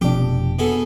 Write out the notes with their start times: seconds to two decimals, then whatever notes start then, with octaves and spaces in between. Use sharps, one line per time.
0.01 F1 F2 B2 D4 G4
0.59 B2 G#4 A4